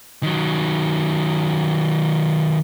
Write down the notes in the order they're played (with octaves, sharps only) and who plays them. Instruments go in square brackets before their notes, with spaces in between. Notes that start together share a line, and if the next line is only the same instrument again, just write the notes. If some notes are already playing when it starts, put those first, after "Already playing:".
[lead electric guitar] D#3 F#3